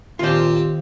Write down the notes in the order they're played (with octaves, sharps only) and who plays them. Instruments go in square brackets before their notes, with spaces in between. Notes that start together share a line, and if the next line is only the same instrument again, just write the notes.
[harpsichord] D#2 [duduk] A#2 [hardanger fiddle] C4 G4 [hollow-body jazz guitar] F4 C5